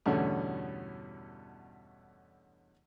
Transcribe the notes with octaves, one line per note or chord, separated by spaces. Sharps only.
E2 G2 B2 D3 A3 C#4